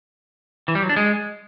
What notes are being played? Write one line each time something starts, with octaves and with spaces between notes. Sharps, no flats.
E3
G3
F#3
D4
G#3